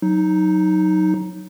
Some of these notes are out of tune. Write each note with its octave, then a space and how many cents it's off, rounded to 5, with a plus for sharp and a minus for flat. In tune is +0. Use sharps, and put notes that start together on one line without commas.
F#3 -10 D#4 +5